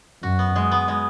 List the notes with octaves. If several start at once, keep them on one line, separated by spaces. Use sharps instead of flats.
F#2 F#4
B3
G#3
B3
G#3